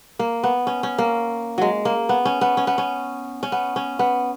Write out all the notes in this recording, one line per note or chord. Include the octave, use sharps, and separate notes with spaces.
A#3
B3
C#4
C#4
A#3
F#3 G#3
A#3
B3
C#4
B3
C#4
B3
C#4
C#4
B3
C#4
B3